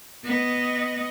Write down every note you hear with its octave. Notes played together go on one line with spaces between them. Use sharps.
B3 D#5